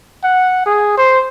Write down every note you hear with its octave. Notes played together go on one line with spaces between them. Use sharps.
F#5
G#4
C5